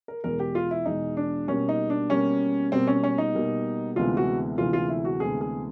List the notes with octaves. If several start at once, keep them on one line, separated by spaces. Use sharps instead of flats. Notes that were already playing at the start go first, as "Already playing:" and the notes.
A#4
E2 B2 G#3 A#4
G4
F4
E4
E2 B2 G#3 D#4
D4
B2 G3 A#3 C#4
D#4
D4
B2 G3 A#3 C#4
B2 G3 A#3 C4
C#4
C#4
D#4
B2 G3 A#3
D2 C3 E3 G#3 B3 F4
F#4
D2 C3 E3 G#3 B3 F4
F4
E4
F#4
D2 C3 E3 G#3 B3 G#4
G#4